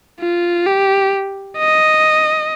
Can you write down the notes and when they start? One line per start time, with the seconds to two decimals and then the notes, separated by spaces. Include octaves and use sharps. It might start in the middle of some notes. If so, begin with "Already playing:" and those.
0.20 F4
0.66 G4
1.57 D#5